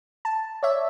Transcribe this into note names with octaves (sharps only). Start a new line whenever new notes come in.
A5
C#5 D5 E5